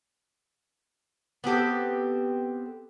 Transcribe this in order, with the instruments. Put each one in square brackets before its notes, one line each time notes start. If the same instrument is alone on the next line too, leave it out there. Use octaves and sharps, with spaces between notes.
[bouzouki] B3 C4 G4 A4